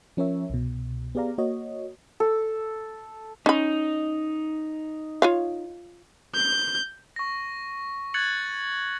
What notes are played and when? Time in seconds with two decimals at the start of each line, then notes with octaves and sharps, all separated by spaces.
0.17 F3 C#4 A#4 C#5 E5
0.50 C2 B2
1.15 B3 G4 G#4 D5 F5 A#5
1.38 A#3 F#4 C#5 D#5
2.20 A4
3.46 C#4 D#4 B5
5.22 F4 C#5 F5
6.35 G6
7.16 C#6 A#6
8.14 F#6 G#6 A6 C#7 F#7